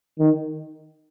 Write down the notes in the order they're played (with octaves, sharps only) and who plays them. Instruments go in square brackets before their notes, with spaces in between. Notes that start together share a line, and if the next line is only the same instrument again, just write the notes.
[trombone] D#3